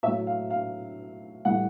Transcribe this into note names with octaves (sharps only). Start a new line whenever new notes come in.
A2 F#3 E5
F5
F5
A2 E3 G3 F#5